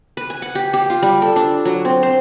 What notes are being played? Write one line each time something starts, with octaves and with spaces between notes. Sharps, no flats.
B4
G#5
F#5
G4
G4
F4
G3
A4
D4
F#3
C4
C5